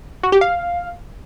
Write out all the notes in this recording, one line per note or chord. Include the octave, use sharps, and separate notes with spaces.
F#4
G4
F5